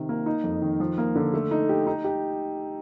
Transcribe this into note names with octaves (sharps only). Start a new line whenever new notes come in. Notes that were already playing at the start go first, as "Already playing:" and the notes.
Already playing: C3 D#3
A#3
D#4
F2
D#3
F3
A#3
D3
A3
D#4
G4
D#4
G4